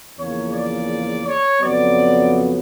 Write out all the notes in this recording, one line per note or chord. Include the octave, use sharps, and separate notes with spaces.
E2 C#3 F3 A#3 C#5
D5
C#5
F2 C#3 F#3 B3 D5